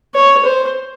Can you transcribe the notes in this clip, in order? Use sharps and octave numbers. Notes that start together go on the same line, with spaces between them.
C#5
C5